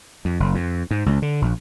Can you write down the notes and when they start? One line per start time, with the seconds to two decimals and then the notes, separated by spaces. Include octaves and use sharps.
0.25 F2
0.40 F#1
0.55 F2
0.91 G#2
1.06 C#2
1.22 D3
1.42 A#1